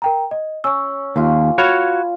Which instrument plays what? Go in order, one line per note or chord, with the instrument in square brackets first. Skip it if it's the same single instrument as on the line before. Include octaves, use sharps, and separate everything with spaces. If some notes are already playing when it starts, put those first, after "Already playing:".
[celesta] A#4 G5 A#5
D#5
[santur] C#4 [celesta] C#6 E6
[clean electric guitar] D#2 [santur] A#3 F4
[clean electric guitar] F#4 C#5 F5 [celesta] B5 G#6